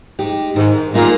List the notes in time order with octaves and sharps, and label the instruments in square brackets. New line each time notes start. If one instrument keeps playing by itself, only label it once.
[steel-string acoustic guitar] G#3 D#4 G4
[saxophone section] G#2 [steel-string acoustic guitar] D#3
[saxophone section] A#2 [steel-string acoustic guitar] G#3 D#4 G#4